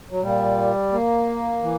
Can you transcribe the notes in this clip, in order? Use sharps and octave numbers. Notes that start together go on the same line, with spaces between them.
F#3
A#2 G3
A#3
E3